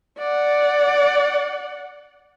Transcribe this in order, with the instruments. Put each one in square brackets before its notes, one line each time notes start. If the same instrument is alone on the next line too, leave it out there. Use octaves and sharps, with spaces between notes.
[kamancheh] D5 F#5